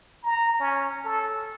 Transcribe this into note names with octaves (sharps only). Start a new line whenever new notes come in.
A#5
C#4
A4